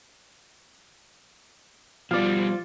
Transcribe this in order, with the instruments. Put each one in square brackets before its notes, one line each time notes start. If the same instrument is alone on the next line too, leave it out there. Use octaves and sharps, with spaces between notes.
[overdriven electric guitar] B2 G3 [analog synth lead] F3 [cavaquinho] D5 F5